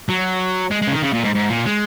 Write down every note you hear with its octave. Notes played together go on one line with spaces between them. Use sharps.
F#3
G#3
G#3
C#3
D#3
C#3
A#2
G#2
G#2
A#2
G#3